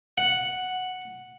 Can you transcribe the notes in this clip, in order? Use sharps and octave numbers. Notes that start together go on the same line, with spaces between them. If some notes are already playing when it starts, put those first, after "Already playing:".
F#5